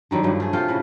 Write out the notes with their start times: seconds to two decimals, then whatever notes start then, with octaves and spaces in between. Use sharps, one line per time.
0.11 D3 D#3 F#3 G3
0.23 G2 F3 F#3 A3
0.40 A3 G#4
0.53 C3 F4 A4 G5
0.68 A2 C#3 B4